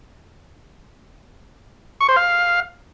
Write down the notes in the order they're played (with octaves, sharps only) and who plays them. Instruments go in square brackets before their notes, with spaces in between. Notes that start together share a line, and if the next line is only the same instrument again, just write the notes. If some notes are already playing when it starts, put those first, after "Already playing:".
[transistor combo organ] C#6
C5
F5